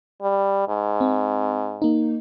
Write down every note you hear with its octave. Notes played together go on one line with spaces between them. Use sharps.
G3
G#2
C4
A#3 D#4